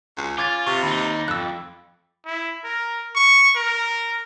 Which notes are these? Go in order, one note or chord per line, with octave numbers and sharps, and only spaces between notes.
C#2
C#4 F4 D6 G#6 A6
C3 C#6
D#2 D#4 B5
F2 A3 E6 F#6
E4
A#4
C#6
A#4